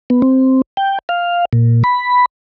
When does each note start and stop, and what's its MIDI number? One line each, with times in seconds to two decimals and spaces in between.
0.10 0.22 59
0.22 0.62 60
0.77 0.99 79
1.09 1.45 77
1.53 1.83 46
1.84 2.26 83